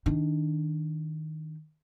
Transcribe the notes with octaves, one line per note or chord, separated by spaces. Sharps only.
D#3 D4